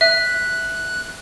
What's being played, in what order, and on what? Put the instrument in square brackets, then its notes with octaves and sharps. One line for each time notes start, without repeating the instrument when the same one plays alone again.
[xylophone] E5 [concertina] F#6